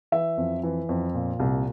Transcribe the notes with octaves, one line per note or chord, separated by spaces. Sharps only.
E3 E5
F2
E3
F2
A#2
C2